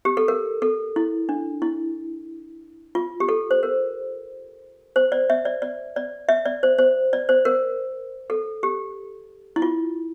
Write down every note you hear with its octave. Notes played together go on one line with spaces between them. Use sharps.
G4
A4
A#4
A4
E4
D4
E4
F4
G4
A4
C5
A#4
C5
D5
E5
D5
D5
D5
E5
D5
C5
C5
D5
C5
A#4
A4
G4
E4
F4